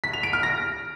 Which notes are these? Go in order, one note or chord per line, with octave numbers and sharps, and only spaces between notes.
B6
F7
D7
F6
A#6